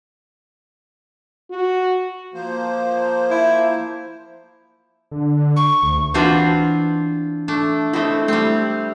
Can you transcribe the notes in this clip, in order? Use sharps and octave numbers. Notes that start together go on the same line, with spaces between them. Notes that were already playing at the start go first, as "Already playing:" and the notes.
F#4
F3 A#3 C5
E4
D3
C#6
D2
E3 C4 D4 F4 F#4 B4
A3 D4
A3 C4 E4 D#5
G3 A3 C4